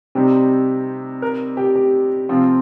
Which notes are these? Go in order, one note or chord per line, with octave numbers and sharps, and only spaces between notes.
C3 G3 C4 D#4 G4
A#4
G4
G4
C3 F3 C4 F4